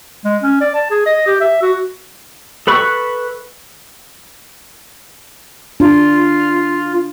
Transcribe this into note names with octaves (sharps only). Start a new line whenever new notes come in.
G#3
C#4
D5
A5
G#4
D#5
G4
E5
F#4
A4 B4 B5 C#6
D4 F4